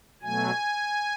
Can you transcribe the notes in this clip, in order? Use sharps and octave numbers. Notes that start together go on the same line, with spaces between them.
B2 F#3 A3 G#5